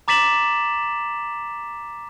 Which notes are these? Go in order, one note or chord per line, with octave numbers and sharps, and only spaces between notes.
A#5 D6 A6 B6 E7 F#7